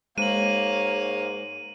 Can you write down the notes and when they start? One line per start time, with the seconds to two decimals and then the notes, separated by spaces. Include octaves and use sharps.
0.18 G#2 G#3 A#3 C#5 D#7 F#7